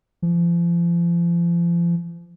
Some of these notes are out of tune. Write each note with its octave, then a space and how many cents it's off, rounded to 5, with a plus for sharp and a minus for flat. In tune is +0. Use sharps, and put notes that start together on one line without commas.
F3 -35